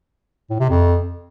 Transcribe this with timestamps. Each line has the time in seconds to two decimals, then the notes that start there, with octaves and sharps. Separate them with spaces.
0.50 A2
0.60 C3
0.70 F2